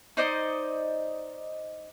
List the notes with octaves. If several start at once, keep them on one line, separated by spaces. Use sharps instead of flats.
D#4 C5 D5 D#5